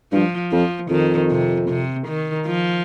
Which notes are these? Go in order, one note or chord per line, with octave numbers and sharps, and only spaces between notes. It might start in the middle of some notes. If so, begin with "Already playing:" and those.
G2 F3
F2 F3
F2 D#3
C3
C3
D#3
F3